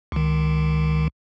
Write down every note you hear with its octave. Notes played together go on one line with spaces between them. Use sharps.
C#2 D#3